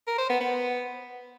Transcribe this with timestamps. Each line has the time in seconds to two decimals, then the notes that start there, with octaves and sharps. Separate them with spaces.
0.07 A#4
0.18 C5
0.29 B3
0.40 B3